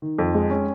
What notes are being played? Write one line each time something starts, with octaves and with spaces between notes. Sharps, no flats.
D#3
F2
G#3
C#4